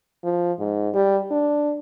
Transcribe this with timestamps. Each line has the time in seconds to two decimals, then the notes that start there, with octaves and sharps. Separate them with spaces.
0.24 F3
0.59 G#2
0.94 G3
1.31 D4